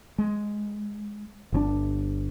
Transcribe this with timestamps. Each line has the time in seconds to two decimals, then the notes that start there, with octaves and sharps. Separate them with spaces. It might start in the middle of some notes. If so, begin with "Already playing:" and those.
0.18 G#3
1.52 G1 C#3 D4